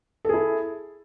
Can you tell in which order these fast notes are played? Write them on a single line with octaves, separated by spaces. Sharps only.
A4 G#4 E4